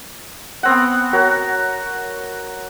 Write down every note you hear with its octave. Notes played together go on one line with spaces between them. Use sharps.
B3 C4 F#5
F#4 A#4 C#5